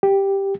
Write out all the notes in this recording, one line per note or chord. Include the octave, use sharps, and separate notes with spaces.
G4